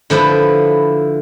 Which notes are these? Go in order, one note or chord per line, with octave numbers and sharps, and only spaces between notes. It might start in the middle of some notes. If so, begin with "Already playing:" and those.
D3 F3 E4 B4